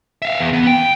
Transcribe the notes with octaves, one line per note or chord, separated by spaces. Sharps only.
E5 F5
E2
B3
G5